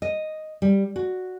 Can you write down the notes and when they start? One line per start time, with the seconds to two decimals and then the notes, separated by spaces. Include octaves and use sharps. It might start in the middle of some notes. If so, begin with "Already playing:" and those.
0.02 D#5
0.62 G3
0.96 F#4